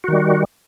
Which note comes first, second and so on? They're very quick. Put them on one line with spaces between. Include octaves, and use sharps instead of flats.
F#4 D#3 G3